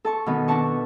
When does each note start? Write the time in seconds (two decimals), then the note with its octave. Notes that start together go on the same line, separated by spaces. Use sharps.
0.05 A4 A5 C#6
0.26 B2 D#3 B3
0.48 D4 F#4 B4 A5 C#6